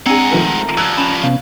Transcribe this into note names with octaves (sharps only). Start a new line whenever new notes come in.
G#3 C4 D4 G#4 F#5 A#5 D#7
D#3 F3 A3
F3 G3 E6 F#6 G#6
C#4 B5 E7 F7
C3 B3 C#4 F5